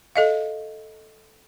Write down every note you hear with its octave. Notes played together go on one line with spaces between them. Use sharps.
A4 D#5 F5